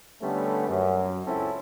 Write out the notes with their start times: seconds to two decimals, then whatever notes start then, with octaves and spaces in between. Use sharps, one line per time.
0.21 D3 G3 A3 B3 C#4
0.68 F#2
1.25 C#2 C4 C#4 E4 A4